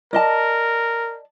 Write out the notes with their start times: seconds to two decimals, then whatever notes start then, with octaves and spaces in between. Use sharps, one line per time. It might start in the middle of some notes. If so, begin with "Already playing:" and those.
0.13 A#4 D5 D#5 A5